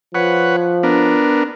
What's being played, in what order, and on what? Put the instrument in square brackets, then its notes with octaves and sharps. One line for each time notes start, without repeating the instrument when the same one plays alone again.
[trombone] F3 [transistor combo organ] B4 C#5 F#5
[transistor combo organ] B3 D4 A#4